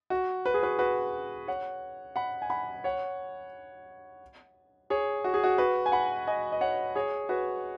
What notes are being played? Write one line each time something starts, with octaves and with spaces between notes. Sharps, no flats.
F#4
B4
G#4
F#4 B4
F#4 B4
C#5 F#5
F#5 B5
G#5
F#5 B5
C#5 F#5
G#4 C#5
F#4
G#4
F#4
F#4 B4
G#5
F#5 B5
D#5 G#5
D#5
C#5 F#5
G#4 C#5
F#4 B4